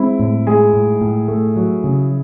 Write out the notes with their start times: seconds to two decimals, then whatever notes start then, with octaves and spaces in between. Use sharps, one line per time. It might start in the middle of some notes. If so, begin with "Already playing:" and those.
Already playing: G#3 C4 E4
0.20 A2
0.47 G#3 G#4
0.74 A2
1.02 A2
1.28 A3
1.56 F#3
1.84 C#3